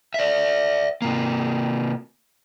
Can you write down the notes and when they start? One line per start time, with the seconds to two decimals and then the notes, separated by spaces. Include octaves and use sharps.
0.14 D5 E5
1.02 C3 A#3